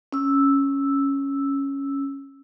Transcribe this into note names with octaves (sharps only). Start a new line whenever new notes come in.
C#4 E6